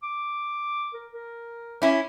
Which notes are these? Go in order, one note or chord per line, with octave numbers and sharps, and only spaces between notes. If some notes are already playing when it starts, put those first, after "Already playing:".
D6
A#4
A#4
C#4 E4